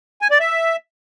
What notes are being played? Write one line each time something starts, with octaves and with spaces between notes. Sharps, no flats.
G#5
D5
E5